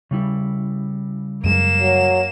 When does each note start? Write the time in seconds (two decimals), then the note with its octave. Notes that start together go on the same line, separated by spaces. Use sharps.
0.11 C#3 G3 E4
1.44 F#2 G#3 A#3 E7
1.81 F#3